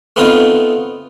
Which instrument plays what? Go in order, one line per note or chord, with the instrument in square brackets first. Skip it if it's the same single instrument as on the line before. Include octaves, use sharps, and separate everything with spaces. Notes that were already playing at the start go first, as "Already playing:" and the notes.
[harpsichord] A3 B3 C4 D#4 F4